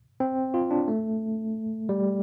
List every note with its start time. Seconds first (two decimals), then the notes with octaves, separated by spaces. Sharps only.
0.20 C4
0.54 F4
0.71 D4
0.88 A3
1.89 G3